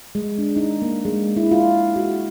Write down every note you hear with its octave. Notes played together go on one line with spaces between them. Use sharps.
G#3
D4
D#4
A#3
G#3
E4
F4
F#4